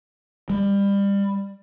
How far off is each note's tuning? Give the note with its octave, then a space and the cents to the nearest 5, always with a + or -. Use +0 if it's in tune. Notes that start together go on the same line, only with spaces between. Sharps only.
G3 +25